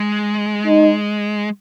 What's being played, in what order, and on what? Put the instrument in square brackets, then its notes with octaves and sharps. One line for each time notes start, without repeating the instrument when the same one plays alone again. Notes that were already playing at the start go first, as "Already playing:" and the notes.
Already playing: [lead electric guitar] G#3
[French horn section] D#4